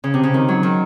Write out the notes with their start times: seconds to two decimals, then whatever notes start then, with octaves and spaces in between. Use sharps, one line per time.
0.04 C#3
0.14 C3
0.23 C#3
0.34 D#3
0.49 F#3
0.63 D#3